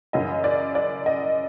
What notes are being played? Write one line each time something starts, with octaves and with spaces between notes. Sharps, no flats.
F#2 C#3 E3 D#5
D5
D5
D#5